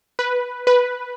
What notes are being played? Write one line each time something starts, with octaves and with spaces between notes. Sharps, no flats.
B4
B4